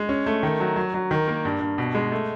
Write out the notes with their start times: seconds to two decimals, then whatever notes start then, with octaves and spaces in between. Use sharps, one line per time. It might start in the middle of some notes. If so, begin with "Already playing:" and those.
Already playing: G#3
0.09 C#4
0.26 A3
0.43 D#3
0.60 F#3
0.76 F#3
0.94 F#3
1.11 D#3
1.28 A#3
1.45 G2
1.60 G2
1.78 B2
1.95 G#3
2.12 A3